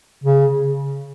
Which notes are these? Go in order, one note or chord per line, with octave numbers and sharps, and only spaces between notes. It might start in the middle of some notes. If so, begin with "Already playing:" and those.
C#3